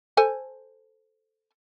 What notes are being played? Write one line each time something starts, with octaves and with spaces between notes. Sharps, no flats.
A4 C5 G#5